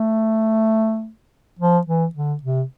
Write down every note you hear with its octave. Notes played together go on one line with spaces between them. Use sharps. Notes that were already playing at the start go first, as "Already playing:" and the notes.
Already playing: A3
F3
E3
D3
C3